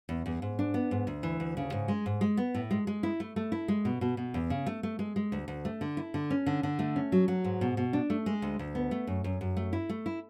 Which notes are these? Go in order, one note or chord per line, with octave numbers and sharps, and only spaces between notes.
E2
E2
G#2
D4
B3
G#2
D2
E3
D2
C#3
G#2
G#3
G#2
G#3
B3
A2
G#3
G#3
E4
A3
A3
E4
G#3
B2
B2
B2
E2
C#3
A3
A3
G#3
G#3
D2
D2
A3
D3
E4
D3
C#4
D3
D3
A3
C#4
F#3
F#3
G#2
B2
B2
D4
A3
G#3
D2
D2
B3
A3
F#2
F#2
F#2
A3
E4
A3
E4